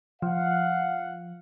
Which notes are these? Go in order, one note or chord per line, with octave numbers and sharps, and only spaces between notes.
F3 F5 F#5